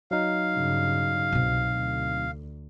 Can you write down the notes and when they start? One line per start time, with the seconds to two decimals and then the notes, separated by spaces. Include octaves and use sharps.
0.11 F#3 D#4 F5
0.53 G2 C#3
1.33 C2 B2 C4
1.76 D2